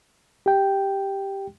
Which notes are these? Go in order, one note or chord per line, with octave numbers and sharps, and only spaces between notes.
G4 G5